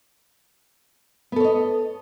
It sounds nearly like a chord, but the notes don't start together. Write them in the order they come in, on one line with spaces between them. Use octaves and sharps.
B3 A4 C#5 D#5